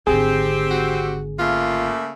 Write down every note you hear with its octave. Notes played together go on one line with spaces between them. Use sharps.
G#1 D3 C4 G4 G#4
F#4
C#3 A3 A#3 F4